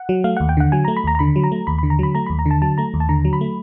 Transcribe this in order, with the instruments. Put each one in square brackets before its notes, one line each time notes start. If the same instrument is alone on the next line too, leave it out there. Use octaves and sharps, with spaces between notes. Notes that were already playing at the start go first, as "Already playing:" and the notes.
Already playing: [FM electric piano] F#5
F#3
A3 F5
D#2 F#5
G5
D3 F#5
F#3 G#5
A3 A#5
B5
D#2 A#5
A#5
D3 B5
F#3
A#5
A3
D#2 B5
D3 B5
A#5
F#3 B5
A3 A#5
D#2 B5
A#5
D3 A5
F#3 A5
A3 A#5
D#2
A5
D3 A#5
F#3
B5
A3